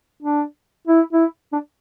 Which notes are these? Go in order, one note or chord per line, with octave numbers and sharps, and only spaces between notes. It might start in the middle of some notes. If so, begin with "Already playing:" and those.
D4
E4
E4
D4